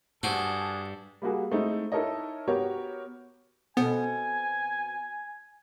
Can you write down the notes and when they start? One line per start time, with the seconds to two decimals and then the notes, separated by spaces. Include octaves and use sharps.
0.23 G2 D4 F#4 G#4 A4 C5
1.22 G3 A#3 F#4 G#4
1.51 G#3 A3 C4 D#4 E4
1.92 D#4 E4 A4 A#4 C#5 D#5
2.48 B3 F#4 G4 A#4 C#5
3.77 B2 B3 C4 A4 G#5